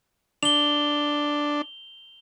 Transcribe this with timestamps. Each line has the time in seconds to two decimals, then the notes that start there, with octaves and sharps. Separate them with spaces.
0.43 D4 F7 G7